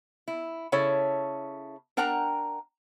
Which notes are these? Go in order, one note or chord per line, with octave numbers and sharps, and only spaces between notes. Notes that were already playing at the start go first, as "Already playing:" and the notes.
E4
C#3 E4 A4 C#5
D4 A#4 F#5 G5 A#5